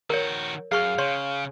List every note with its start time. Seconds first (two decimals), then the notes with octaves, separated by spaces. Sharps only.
0.10 D#3 F#4 A#4 C#5
0.72 F#2 G#4 F5 C#6 F6
0.98 C#3 C#5 C6 C#6